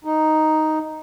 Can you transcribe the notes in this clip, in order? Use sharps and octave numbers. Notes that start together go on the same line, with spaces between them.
D#4